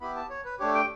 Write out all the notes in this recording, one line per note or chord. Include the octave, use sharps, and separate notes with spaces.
B3 E4 G4 B5
A5
C#5
B4
A3 D4 G4 C#5
G5